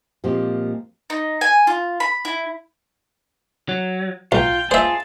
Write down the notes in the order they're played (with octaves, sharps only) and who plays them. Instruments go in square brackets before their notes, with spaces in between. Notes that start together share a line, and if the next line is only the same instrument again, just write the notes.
[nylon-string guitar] A#2 F3 G#3 A#3 C4 G4
[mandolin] D#4
G#5
F4
B5
E4
[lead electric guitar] F#3
[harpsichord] B1 [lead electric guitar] F4 [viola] G5
[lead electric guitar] F4 G#4 [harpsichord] C5 E5 [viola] A5